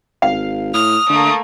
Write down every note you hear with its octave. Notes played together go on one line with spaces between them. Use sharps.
G#1 F5
A2 D#6 F6
D3 A3 A#3